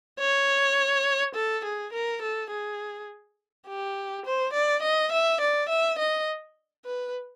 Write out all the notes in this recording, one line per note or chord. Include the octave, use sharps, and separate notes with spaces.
C#5
A4
G#4
A#4
A4
G#4
G4
C5
D5
D#5
E5
D5
E5
D#5
B4